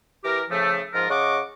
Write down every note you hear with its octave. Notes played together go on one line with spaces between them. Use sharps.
E3 G4 A#4
C#3 F3 A3
G#2 F3 F4 A#4
C#3 D#5 F#5 C#6 D6